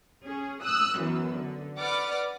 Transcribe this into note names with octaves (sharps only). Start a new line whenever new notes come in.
C#4 G#4
D#6 E6 F#6
F#2 E3 B3
D3
B4 D5 F#5 D6 F6 A6